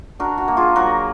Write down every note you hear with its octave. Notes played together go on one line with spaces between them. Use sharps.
D4 F#4 A#4
F#4
A#3
F4 G#4
F#3 F#4 A#4